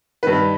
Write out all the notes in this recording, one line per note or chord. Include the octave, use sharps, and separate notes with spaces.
G2 D#3 B4